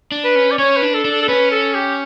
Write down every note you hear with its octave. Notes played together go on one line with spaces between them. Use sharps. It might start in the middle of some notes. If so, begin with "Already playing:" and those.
D4
B4
C#4
D5
C#4 C#5
B4
D4
A4
D4
A4
A4
C#4 B4
A4
G4